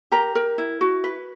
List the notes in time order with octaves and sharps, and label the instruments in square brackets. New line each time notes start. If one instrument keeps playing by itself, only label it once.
[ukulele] G4 A#4 A#5
A#4
E4
F#4
B4